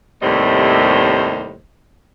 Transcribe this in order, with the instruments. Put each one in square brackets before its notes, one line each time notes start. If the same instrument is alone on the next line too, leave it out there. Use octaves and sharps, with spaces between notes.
[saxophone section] D#2 A2 C3 G3 C5 D#5